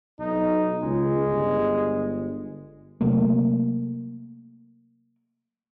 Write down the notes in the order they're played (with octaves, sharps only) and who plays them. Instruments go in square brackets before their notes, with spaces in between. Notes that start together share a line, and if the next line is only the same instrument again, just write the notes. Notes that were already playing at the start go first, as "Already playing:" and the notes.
[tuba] B1 [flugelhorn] D#4
[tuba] C#2 [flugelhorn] G#3
[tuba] G1
[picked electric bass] C3 F#3 A3 A#3